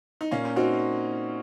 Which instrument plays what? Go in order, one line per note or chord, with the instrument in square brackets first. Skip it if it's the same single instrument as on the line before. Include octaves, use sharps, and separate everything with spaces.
[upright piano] D#4
[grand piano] A#2 [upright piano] A#3 C#4
[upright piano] C#4
[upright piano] C4 D#4 [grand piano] F#4